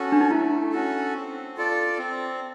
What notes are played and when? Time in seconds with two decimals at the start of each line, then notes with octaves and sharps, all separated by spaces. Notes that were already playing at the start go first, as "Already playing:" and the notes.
Already playing: C#4 F#4 A4
0.12 D4
0.21 D#4
0.30 A3 E4
0.72 C#4 F#4 A4
1.14 C4
1.57 F4 A4 D5
1.98 C4